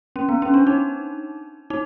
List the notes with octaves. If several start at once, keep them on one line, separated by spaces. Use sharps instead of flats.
C#4
B3
C#4
D4
D#4
D#4